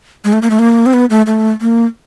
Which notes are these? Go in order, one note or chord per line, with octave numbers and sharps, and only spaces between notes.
G#3
A3
A#3
A3
A#3
C4
B3
A3
A3
A#3